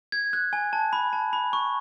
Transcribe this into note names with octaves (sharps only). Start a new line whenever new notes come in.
G#6
F#6
G#5
A5
B5
A5
B5
C#6